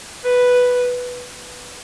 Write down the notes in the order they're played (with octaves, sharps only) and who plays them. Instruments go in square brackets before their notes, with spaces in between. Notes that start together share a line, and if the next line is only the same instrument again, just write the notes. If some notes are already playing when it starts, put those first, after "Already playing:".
[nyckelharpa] B4